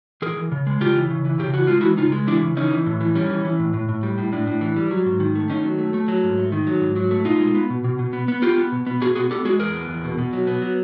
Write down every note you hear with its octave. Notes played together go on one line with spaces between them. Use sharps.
E3 G#4 A#4
E3
C#3
G#3
C#3 F4 G4
E3
C#3
E3
C#3 G4
E3 F#4
G#3 F4
E3 E4 F#4
C#3 D#4 F4
G#3
E3 D4 E4
C#3
E3 C#4 D#4
E3
A2
E3
G3 C#4
E3
E3
A2
A2
A2
G3
A2
A2 D4
A2
E3
G3
F#3
G#2
D#3
A3
D#3 C#4 D#4
F#3
A3
A3
F#3
G#2
A3
D#3
F#3
G#2
F#3
A3
B2 D#4 F4
G#3
B3
B2
B2
B2
B3
B3
B3 F4 G4
B3
B2
B3
B2 F#4 G#4
B3 F#4 G#4
B3 G4 A4
G#3 F#4 G#4
E2 G#4 A#4
B3
E2
B2
B2
F#3
B3
F#3